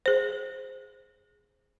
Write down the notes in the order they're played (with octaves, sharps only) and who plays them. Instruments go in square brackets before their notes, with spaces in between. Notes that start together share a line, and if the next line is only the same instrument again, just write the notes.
[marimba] G#4 C5